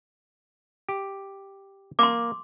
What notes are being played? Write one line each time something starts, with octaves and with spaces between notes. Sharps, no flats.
G4
A#3 C6 D6